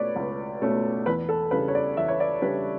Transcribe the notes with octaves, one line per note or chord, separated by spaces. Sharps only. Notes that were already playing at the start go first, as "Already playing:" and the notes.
Already playing: C#2 B2 A3 C#4 B4 C#5 D5
C#2
B2 A3 C#4
E2 B4
A4
C#3 G3 D4 B4
C#5
D5
E2 E5
C#5
D5
C#3 G3 D4 B4